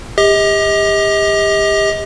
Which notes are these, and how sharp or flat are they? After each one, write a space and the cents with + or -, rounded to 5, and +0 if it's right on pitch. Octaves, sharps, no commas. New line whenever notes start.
G4 +35 D#5 +35